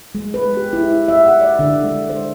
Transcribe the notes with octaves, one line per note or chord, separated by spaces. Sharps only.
G#3
B4
G4
E4
E5
F#5
D5
D3
G#3
C5